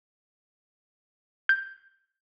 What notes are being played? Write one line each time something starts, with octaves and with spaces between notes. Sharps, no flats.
G6